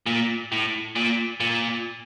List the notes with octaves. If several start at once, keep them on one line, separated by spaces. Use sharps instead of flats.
A#2
A2
A#2
A#2